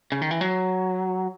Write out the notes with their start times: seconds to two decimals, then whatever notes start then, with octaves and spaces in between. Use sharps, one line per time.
0.12 C#3
0.22 D#3
0.31 E3
0.41 F#3